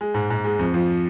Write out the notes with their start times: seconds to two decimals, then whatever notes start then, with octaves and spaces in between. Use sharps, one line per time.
0.01 G#3
0.14 G#2
0.30 G#2
0.44 G#3
0.59 F2
0.74 F3